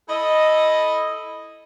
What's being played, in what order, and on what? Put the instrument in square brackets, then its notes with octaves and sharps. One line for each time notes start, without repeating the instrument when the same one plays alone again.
[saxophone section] E4 A4 D#5